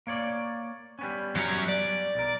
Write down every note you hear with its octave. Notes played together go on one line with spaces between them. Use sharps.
A#3 C#5 D5
G3 B3 C#4
F#2 F#3
D5
B1 A#4